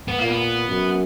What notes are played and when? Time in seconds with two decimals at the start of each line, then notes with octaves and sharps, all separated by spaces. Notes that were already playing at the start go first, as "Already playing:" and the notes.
0.08 B3
0.18 A#2 A#3
0.28 B3
0.68 F#2